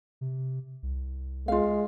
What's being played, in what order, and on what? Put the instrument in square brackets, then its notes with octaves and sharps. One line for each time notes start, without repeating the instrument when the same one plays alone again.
[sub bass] C3
C2
[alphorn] G#3 [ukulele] F4 F5